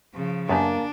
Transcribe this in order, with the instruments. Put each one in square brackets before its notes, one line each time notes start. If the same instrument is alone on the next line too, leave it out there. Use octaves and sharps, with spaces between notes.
[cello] C#3 F3
[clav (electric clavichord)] F#2 B3 G4 [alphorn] A#3 [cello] D4 [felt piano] G#5 A5